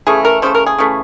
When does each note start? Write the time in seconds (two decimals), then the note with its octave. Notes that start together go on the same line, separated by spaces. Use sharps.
0.07 C#3 E3 A3 G#4
0.25 A#4
0.42 C#3 E3 A3 C5
0.55 A#4
0.66 G#4
0.78 C#3 E3 A3